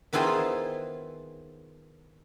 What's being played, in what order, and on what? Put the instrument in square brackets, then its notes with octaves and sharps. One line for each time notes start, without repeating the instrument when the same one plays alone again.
[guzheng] D#3 B3 E4 F4 G#4 C5